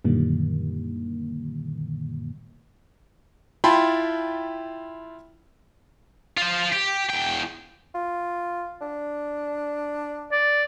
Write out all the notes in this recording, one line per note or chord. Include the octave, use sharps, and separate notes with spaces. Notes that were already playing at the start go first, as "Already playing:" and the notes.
F#2 A#2 D3 D#3 G3 A#3
E4 F4 G5 A5 B5 C6
F4 C5
G4
E2 G5
F4
D4
D5